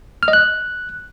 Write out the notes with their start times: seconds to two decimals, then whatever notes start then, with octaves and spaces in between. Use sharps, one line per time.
0.23 F6
0.28 D#5
0.33 F#6